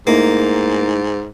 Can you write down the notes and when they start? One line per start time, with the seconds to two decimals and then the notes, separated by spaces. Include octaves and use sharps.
0.07 G#2 A3 A#3 D#4 E4